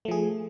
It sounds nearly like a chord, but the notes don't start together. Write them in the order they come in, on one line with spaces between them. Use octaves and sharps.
A3 F3 G#4